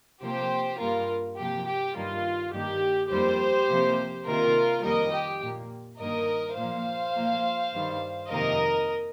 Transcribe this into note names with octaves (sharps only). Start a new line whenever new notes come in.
C3 F3 A#3 G4 C5
G2 G3 A#3 F4 A#4
C3 F3 A#3 G4
G4
G2 D#3 G3 A#3 F4
G2 D#3 A#3 G4
F2 D#3 G3 A#3 G4 C5
C3 F3 A#3
C3 D#3 A#3 F4 A#4
F2 D#3 G3 A#3 A#4 D#5
G4
A#2 A#3
G2 D#3 A#3 A#4 D#5
A#2 F3 A#3 C5 F5
A#2 F3 A#3
G2 D#3 G3
F2 C3 D#3 A#3 A#4 D#5